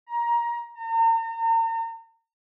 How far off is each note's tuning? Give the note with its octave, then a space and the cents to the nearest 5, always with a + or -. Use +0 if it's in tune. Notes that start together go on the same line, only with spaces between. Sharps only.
A#5 +20
A#5 -40